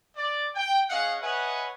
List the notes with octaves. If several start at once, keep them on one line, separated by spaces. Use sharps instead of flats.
D5
G5
C#4 G#4 D#5 F5 F#5
B4 C#5 D#5 E5 F#5 G#5